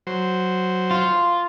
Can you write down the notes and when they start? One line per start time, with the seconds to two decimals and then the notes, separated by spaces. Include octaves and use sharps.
0.07 F#3 C5
0.91 F4